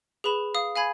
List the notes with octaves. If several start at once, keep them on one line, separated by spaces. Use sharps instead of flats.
G#4 B4 B5 E7
F5 D#6
F5 G#5 B5 G#6